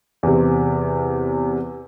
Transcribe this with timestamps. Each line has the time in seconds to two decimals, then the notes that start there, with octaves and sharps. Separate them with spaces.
0.23 E2 C3